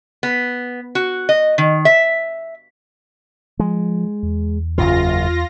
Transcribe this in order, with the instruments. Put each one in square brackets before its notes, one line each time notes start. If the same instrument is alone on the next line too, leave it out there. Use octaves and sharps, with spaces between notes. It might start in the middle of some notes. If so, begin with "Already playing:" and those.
[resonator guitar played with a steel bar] B3
F#4
D#5
D#3
E5
[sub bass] F3 [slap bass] G#3
[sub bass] E2
[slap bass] F#1 F#2 C#3 [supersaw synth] F4 A#6